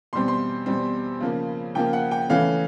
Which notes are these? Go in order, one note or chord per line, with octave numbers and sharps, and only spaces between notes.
E2 B2 G3 C4 C6
C6
E2 B2 G3 C4
C#3 F3 A#3
C#3 F3 A#3 G5
F#5
G5
C#3 E3 A3 C#4 F5